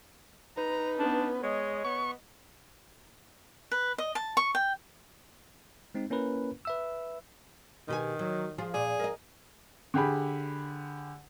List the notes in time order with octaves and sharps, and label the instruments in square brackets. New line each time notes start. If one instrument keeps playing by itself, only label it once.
[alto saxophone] D#4 [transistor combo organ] B4 [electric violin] A#5
[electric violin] B3 C#4 [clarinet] D4
[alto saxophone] G#3 [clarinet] C#5 [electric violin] D#5
[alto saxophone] B3 [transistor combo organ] C#6
[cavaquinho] B4
D#5
A5
C#6
G5
[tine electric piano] G#3 C4 D#4
A#3 C#4 E4 A#4 B4
B4 E5 E6
[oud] B2 G4 G#4 [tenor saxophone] D#3
[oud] F#3
F3 F4 G#4
[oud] A#2 D5 [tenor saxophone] G#4
[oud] A#4 D#5
[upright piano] D3 G4 G#4 B5